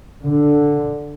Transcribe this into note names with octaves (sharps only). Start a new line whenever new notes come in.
D3